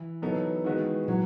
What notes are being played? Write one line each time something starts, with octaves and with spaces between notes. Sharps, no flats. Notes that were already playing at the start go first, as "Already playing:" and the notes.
Already playing: E3
F#3 B3 D#4 A4
D#3 G#3 B3 F#4 B4
E3 F#3